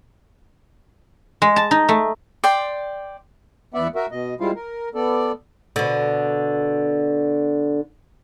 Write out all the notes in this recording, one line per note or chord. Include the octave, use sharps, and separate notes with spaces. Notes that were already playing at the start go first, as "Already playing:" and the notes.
G#3
A5
D#4
A3
D5 G5 C6
E2 B3 D5 E5 F#5
F#4 A#4 E5
B2 D#5
G3 G#3 E4 F4 C5 F5
A#4
B3 A4 D5
B2 D3